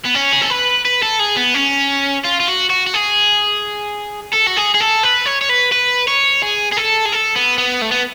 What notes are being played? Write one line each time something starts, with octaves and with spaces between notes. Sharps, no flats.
B3
C#4
G#4
A4
B4
B4
A4
G#4
B3
C#4
F4
F4
F#4
F#4
F#4
G#4
A4
F#4
G#4
G#4
A4
B4
C#5
C#5
B4
B4
C#5
G#4
G#4
A4
G#4
A4
B3
B3
A3
B3